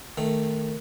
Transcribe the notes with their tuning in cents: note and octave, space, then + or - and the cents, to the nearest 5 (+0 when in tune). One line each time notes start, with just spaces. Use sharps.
D#3 +0 A3 +0